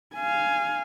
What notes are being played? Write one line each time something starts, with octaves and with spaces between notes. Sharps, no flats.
F5 G#5